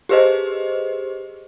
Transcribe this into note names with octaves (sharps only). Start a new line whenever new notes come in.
G4 G#4 B4 C5 D#5